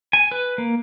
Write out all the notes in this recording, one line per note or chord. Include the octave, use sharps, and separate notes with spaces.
G#5
B4
A#3